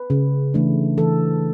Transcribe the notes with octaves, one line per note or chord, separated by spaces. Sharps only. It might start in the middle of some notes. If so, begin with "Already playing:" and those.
Already playing: B4
C#3
E3 A3 D4
E3 A4